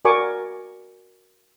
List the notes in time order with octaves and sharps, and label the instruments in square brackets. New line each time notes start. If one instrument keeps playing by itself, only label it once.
[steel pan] F#4 A#4 D5 G#5 C#6 D6